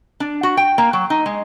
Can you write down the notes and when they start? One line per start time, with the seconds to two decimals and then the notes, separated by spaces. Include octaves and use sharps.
0.20 D4
0.43 F#4
0.57 G5
0.78 A#3
0.93 F#3
1.10 D#4
1.26 G#3